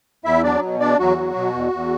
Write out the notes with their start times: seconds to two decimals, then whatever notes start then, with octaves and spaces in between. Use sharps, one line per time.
0.25 E2 E4 E5
0.43 F#3 D4 D5
0.62 B2
0.80 E2 D4 D5
0.99 E2 F#3 F#4
1.18 F#3
1.36 B2
1.54 E2
1.73 E2